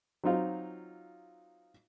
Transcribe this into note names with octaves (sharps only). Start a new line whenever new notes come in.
F#3 C4 D#4 F4